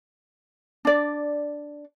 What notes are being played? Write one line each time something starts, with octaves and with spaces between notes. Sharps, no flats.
D4 D5